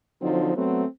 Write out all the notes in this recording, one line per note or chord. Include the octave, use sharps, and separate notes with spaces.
D3 F3 F#3 C4 D#4
F#3 A3 B3 C4